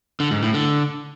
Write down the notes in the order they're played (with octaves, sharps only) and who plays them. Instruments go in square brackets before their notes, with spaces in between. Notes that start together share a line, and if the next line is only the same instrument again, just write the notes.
[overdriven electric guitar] D3
G#2
A2
D3